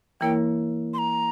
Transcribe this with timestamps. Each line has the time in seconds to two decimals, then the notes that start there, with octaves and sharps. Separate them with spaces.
0.21 E3 A#3 E4 A#4 C#5 G5
0.94 C6
0.98 A#5